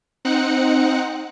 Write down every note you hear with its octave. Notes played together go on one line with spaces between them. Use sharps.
C4 D#4 F#5 F#6 C#7